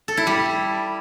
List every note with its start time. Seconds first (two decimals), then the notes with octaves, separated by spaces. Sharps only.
0.08 A4
0.17 E4
0.27 G3